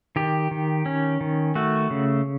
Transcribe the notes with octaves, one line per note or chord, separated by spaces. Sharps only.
D#3 G4
D#3
C#4
D#3
A3 F#4
C#3